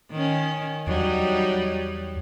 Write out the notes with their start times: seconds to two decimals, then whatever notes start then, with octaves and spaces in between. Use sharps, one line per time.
0.11 D#3 C#4
0.87 E2 F#3 G3 D#4